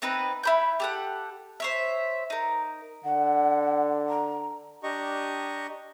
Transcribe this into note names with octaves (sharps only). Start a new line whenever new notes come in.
B3 C4 D#4 B4
E4 B5 G6
G4 A4 F#5
C5 C#5 E5
D#4 A#4
D3 F#5
A#5
D4 G4 D#5 A#5 C#6